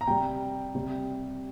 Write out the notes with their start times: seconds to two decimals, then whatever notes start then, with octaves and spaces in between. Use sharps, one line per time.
0.01 A#5
0.07 C3 G3 G5
0.75 C3 G3